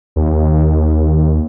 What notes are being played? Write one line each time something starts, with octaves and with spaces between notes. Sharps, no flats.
D#2